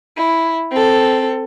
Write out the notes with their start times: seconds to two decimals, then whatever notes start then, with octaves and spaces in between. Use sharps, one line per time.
0.17 E4
0.71 C4 A4